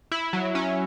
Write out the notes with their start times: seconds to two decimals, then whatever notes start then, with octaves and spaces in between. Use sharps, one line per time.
0.12 E4
0.33 F#3
0.55 C#4